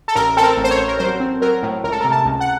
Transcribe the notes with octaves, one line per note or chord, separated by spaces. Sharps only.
A4
A1 A#4
C4 A4
A#4
A1
C5
C#5
A1
A#4
F#3 C5
C4
F#3 A#4
A2
C#2 A#4
A4
C3 A#4
A5
C#2
F#5